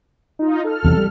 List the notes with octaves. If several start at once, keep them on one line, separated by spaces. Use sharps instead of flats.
D#4 F4
A4 F6
E2 C3 F#3
G3